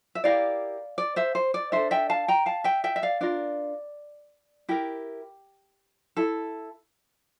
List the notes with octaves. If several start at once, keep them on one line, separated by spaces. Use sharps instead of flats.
E5
E4 G4 A#4 D5 F5
D5
C5 E5
C5
D5
D4 A4 C5 E5
E5 G5
F5 A5
G5 A#5
F5 A5
E5 G5
E5 G5
E5
D5 F5
D4 F4 A#4 D5
E4 G4 A#4
E4 A4